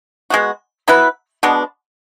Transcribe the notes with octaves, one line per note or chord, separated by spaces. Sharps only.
G#3 B3 F#4
F#3 B3 E4 B4
B2 G#3 B3 D4